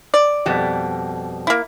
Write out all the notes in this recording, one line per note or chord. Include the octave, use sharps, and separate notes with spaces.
D5
F2 B2 G3
A#3 E4